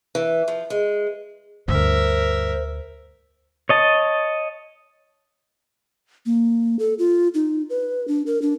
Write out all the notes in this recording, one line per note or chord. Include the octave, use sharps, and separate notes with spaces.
E3
F3
G#3
D2 G2 D3 A#4 C5 E5
C#5 D#5 A5
A#3
A4
F4
D#4
B4
D4
A#4
D4